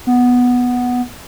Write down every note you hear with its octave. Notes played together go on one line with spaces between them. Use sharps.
B3